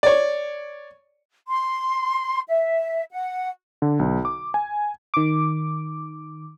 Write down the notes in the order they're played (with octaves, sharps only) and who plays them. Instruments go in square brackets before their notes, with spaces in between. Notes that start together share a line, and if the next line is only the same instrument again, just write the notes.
[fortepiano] C#5 D5
[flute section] C6
E5
F#5
[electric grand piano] D3
B1
D6
G#5
[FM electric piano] D#3 D6